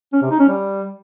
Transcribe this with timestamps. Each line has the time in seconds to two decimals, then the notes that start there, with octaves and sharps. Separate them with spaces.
0.13 C#4
0.22 C3
0.31 D#4
0.40 C#4
0.48 G3